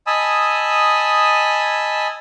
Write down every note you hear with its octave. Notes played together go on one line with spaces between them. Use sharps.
D#5 G#5 A5 B5 D#6 E6